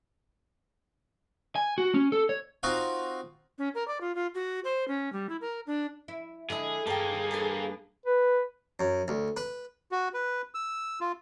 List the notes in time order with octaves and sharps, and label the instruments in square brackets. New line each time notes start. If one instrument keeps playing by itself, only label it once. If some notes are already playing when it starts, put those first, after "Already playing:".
[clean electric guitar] G#5
F#4
C#4
A4
C#5
[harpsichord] C4 D#4 F4 F#4 F5
[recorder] C#4
A#4
D5
F4
F4
F#4
C5
C#4
G3
E4
A#4
D4
[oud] E4
[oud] D3 G#3 D4 [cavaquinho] E4 D#6 [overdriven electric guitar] G#4
[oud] G2 [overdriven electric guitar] A#3 G4 [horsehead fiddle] G#4 [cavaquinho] G5 A5
[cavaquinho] A4 B4 G#5
[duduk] B4
[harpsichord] F#2
D2
B4
[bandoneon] F#4
B4
E6
F4